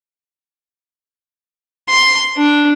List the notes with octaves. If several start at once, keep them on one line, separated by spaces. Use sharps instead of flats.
C6
D4